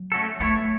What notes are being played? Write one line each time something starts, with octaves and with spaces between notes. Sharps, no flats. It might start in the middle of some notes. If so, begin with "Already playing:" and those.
Already playing: F#3
A3 C#4 F#4 A4
A3 B3 E4 A4 C#5